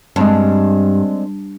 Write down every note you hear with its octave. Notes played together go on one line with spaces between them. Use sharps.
G2 G#3 C4 D4